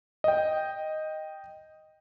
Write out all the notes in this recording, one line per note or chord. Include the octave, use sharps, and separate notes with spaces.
D#5 G5